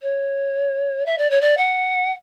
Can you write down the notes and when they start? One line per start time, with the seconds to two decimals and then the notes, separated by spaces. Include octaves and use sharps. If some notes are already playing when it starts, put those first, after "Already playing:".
0.02 C#5
1.06 E5
1.18 D5
1.30 C#5
1.41 D5
1.57 F#5